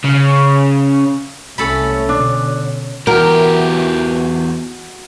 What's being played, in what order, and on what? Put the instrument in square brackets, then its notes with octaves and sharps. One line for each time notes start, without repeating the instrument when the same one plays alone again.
[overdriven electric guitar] C#3
[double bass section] C2 A3 [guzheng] C#4 A4 B5
[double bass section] B2 D3 [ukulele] D4
[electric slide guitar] E2 G4 [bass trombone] E3 [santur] F#4 [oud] A#4